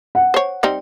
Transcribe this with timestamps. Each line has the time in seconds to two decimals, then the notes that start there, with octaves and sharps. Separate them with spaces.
0.15 F#5
0.34 C5 C#5
0.63 G3 C4 D#4